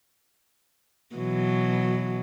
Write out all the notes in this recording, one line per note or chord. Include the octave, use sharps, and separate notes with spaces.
B2 E3 F#3